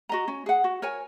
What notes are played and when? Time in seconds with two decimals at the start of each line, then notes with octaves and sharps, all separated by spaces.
0.09 F#4 D#5 A#5
0.28 C#4
0.46 G#4 F#5
0.64 F#4
0.82 A#4 C#5 G#5